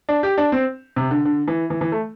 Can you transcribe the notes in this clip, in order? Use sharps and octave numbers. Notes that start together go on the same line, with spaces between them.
D4
G4
D4
C4
C3
D3
D3
E3
E3
E3
A3